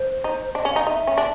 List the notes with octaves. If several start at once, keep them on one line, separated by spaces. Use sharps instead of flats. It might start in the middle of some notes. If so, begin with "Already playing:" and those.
Already playing: C5
D#4
D4 D#5
C#4
F5
D#4
D#4 E5
C#4
D4